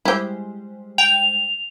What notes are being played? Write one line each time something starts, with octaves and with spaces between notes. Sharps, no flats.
G3 G#3 E4 G4 C5
G5 F7